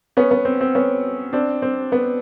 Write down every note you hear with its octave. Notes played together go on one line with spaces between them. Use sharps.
B3 C#4
B3
C4
C4
B3 C#4
C4 D4
C4
B3